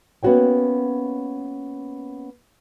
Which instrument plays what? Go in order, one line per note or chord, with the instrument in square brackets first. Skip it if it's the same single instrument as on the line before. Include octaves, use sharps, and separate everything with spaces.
[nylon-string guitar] A#3 B3 C#4 F#4 C#5 G5